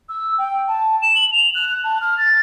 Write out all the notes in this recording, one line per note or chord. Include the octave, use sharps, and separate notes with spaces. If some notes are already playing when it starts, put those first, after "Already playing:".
E6
G5
A5
E7
F#7
F7
F#6
A5
F6
A6